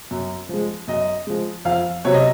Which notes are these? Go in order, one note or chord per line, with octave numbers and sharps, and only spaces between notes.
F#2
F3 G#3
F#2 D#5
F3 G#3
F2 F5
C3 F#3 C#5
D#5